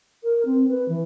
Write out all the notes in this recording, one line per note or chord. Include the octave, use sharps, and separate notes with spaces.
A#4
C4
B4
E3